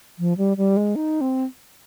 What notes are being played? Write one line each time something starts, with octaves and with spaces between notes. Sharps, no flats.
F3
G3
G3
G#3
D#4
C4